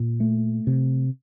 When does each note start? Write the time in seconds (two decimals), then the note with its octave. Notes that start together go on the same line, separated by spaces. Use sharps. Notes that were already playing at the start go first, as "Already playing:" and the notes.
Already playing: A#2
0.20 A3
0.67 C3